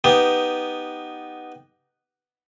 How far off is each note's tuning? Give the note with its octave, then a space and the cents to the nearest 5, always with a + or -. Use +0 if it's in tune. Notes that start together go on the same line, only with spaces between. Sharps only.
B3 +0 D#4 +0 G4 +0